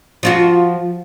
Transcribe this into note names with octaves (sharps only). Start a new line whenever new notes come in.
F3 F4 F#4